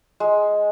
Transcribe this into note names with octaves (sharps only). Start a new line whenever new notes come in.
G#3